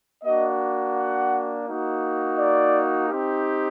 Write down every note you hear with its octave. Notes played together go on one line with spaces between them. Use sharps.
A#3 D4 F#4 D#5
F#5
A#3 D#4 F#4
D5
C4 D#4 G4